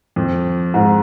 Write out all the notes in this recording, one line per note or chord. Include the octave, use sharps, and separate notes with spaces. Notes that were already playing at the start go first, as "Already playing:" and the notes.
F2
G#2